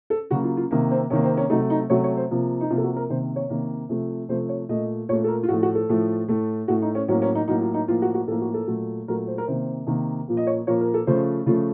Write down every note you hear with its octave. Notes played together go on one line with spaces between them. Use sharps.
A4
C#3 F#3 A#3 F#4
F4
F4
C3 D#3 A#3
C4
C3 D#3 A#3 C#4
C4
C#4
C3 F#3 A3 D#4
D#4
C3 F#3 A3 C#5
C#5
C5
C3 F3 A#3
D#4
C3 F3 A#3 F4
A4
F#4
A#4
C3 D#3 A#3 C5
C#5
C3 D#3 A#3
C3 F3 A3
C3 F3 A3 C5
C#5
A#2 A3 D#5
A#2 A3 C#5
A4
A#4
F4
A2 F3 A3 F#4
F#4
A4
A2 F3 A3
A2 A3
A2 A3 F#4
D#4
C#4
A2 F#3 A#3 C#4
C#4
D#4
A2 F#3 A#3 D#4
F4
D#4
A2 F3 A#3 F4
F#4
F#4
A2 F3 A#3 A4
F#4
A4
A#2 F#3 A3
A#2 F#3 A3 A#4
C5
A#4
C3 D#3 A#3 C5
C3 D#3 A#3
A#2 F3 A#3
D#5
C#5
A#2 F3 A#3 C#5
A#4
A4
C#3 F3 A3 C5
C#3 F3 A3 F4